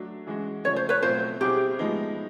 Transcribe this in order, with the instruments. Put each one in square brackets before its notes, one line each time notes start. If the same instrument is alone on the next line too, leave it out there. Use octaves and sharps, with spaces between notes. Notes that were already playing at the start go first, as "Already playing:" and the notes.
Already playing: [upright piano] F#3 A3 D4
E3 G#3 C#4 F#4
[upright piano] C#3 F3 A3 [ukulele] C#5
[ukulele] C5
B4 C#5
[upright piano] B2 F#3 A3 C4 F4 [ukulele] C5
[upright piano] B2 G3 C4 E4 G#4 [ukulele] G4
[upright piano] A2 F3 G#3 B3 D#4